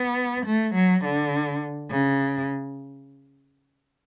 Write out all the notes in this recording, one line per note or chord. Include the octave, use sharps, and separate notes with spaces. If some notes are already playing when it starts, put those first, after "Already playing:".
Already playing: B3
A3
F#3
D3
C#3